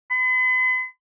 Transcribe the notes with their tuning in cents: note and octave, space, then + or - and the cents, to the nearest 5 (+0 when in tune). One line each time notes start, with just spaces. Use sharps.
B5 +45